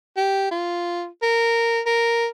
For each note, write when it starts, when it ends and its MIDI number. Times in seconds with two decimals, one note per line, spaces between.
0.17 0.51 67
0.51 1.06 65
1.23 1.80 70
1.86 2.27 70